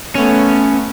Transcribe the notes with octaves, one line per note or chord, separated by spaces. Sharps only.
A3 B3 C#4